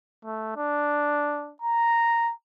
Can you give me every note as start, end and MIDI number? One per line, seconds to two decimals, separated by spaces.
0.25 0.52 57
0.56 1.53 62
1.62 2.32 82